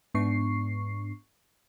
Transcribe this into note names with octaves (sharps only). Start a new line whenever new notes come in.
G#2 B3 D4 C#6 C7